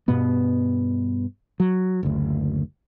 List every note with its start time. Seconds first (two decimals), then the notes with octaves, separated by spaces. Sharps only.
0.08 G2 B2 B3
1.60 F#3
2.03 F#1 D2